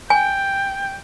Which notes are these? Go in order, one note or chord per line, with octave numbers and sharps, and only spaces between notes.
G5 G#5